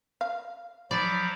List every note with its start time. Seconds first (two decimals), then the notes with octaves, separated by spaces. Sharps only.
0.21 F5
0.91 F3 F#3 D5 B5